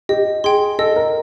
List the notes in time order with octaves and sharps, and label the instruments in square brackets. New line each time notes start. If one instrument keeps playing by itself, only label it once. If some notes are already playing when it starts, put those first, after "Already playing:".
[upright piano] G4 [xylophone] D#5
[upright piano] G#4 [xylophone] G5 C6
[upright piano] A4 [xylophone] D#5
[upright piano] A#4